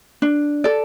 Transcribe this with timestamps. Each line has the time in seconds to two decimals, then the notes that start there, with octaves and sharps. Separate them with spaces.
0.22 D4
0.64 A4 D5